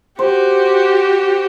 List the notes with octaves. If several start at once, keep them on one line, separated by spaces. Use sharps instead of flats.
F#4 G4 C5